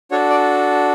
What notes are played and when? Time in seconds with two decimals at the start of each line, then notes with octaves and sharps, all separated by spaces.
0.11 D4 F#4 A4 C#5
0.30 D5